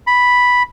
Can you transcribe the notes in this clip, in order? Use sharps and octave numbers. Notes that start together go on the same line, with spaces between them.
B5